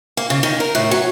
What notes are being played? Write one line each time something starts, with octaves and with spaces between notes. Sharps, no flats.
A#3
C#3
D#3
A#4
A2
F#3